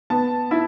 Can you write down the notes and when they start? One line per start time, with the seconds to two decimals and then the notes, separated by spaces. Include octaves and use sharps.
0.10 B3 A5
0.51 E4